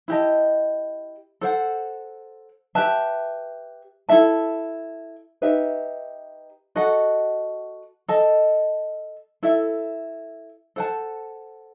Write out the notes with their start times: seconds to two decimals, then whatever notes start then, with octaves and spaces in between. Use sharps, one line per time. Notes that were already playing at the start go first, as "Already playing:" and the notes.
0.08 E4 G4 D#5 A5
1.41 A4 C5 F#5
2.75 G4 B4 E5 A5
4.09 E4 A4 E5 A5
5.42 D#4 G4 B4 E5
6.75 F#4 A4 D#5 F#5
8.08 A4 D#5 A5
9.43 E4 A4 E5
10.76 A4 C5 F#5 A5